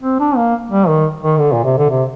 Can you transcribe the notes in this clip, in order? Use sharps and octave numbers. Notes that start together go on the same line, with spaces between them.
C4
D4
A#3
G3
D#3
D#3
D3
A#2
C3
D3
C3